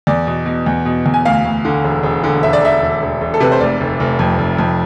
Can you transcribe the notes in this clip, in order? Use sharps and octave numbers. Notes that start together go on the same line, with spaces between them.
E2 D5
B2
B2
E2
B2
E2
G#5
D2 F5
D2
D3
E1
E1
D3
E1 E5
D5
E1 E5
E1
E1
E1
A4
C3 B4
C5
F1 D5
F1
F1
F2
F1
F2